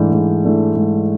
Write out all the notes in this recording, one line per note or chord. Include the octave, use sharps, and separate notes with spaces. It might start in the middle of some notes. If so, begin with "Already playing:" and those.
Already playing: G#2 E3 A3 D4
G#2
E3 A3 D4
G#2